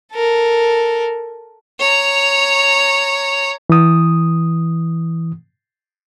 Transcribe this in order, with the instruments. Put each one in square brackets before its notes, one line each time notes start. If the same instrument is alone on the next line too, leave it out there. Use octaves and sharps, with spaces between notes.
[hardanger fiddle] A4 A#4
[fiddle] C#5 A#5
[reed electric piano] E3 D#6